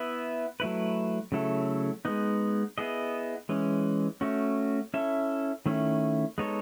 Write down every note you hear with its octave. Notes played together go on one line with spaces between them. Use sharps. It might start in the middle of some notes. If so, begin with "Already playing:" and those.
Already playing: B3 E4 B4 E5
F#3 A3 E4 B4
C#3 F#3 A3 E4 A4
G#3 B3 D#4
B3 E4 G#4 D#5
E3 G#3 C#4
A3 C#4 F#4
C#4 E4 A4 E5
D#3 A3 C#4 E4
G#3 B3 D#4 A4 C#5